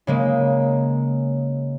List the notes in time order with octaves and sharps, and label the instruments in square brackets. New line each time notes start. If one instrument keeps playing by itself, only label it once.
[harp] C#3 G#3 A#3